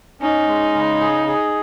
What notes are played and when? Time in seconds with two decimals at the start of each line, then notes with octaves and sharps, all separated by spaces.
0.21 C#4 D#4
0.47 G#3
0.74 C#3
1.01 G#4
1.27 G#4